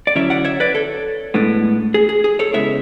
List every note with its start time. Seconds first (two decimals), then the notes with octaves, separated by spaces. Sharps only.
0.07 D5
0.15 D3 F#3 C#4 E4 C#5 E5
0.30 D5 F#5
0.45 C#5 E5
0.60 B4 D5
0.75 A4 C#5
1.34 A2 G#3 B3 D4
1.94 G#4
2.09 G#4
2.24 G#4
2.39 A4 C#5
2.53 C#3 G#3 B3 E4 C#5 E5